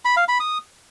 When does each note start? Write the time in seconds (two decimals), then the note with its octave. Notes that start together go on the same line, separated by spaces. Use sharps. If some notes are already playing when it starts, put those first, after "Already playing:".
0.05 B5
0.17 F5
0.28 B5
0.40 D#6